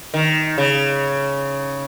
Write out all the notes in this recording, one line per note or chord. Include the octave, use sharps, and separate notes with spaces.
D#3
C#3